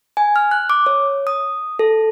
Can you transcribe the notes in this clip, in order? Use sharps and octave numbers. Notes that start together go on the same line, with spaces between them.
G#5
F6
F#6
D6
C#5
D#6
A4